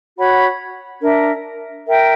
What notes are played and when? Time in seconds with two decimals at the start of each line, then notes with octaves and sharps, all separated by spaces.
0.17 F#4 C#5 F#5 B5
1.02 D4 A#4 E5
1.86 A#4 E5 G5